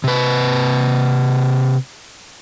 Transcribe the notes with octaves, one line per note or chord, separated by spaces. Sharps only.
C3 B4